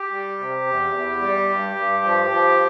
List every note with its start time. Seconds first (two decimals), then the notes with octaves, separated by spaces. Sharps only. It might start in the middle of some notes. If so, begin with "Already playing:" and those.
Already playing: G4
0.10 G3
0.38 C3
0.66 E2
0.94 E2
1.21 G3
1.49 G2
1.76 G2
2.04 F3
2.31 F3